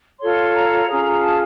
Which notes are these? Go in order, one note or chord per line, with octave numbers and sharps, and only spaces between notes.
F4 A4 C#5 C6
A#5
C#4 F4 G#4
A5